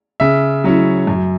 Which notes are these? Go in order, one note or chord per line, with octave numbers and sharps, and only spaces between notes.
C#3 E5
F#3 C#4 E4
F#2